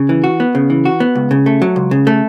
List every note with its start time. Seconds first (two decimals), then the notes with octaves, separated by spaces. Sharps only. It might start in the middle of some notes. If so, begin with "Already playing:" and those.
Already playing: C#3
0.09 E3
0.24 F#4
0.40 B3
0.55 C#3
0.70 E3
0.85 F#4
1.00 B3
1.15 C#2
1.31 C#3
1.46 A3
1.62 F#3
1.76 C#2
1.91 C#3
2.07 A3